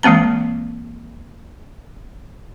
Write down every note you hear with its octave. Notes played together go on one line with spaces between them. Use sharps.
E3 G#3 A#3 C4 A#5